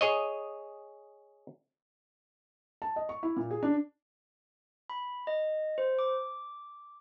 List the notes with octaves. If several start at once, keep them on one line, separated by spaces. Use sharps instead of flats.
G#4 C#5 D#5
A5
D#5
C#6
E4
A#2
G#4
D4
B5
D#5
C5
D6